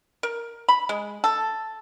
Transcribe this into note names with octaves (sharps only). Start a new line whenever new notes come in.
A#4
B5
G#3
A4